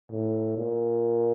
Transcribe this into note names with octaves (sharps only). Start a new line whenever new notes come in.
A2
A#2